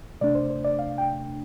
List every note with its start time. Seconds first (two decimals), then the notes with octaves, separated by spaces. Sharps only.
0.21 C3 A3 D4 D5
0.35 C5
0.50 C5
0.64 D5
0.79 F5
0.98 G5